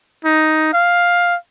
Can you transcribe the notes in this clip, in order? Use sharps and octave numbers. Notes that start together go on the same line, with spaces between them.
D#4
F5